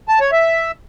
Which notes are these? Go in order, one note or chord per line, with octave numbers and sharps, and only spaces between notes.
A5
C#5
E5